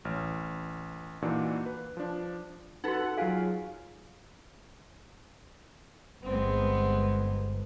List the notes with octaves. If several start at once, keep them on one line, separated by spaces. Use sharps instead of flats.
A1 F6
A#2 E3 D4 D#4 F4 F#4
B4
F3 D4
D#4 F#4 A4 B4 F#5
F#3 F4 G#4 F5 G#5
G1 G#3 B3 C4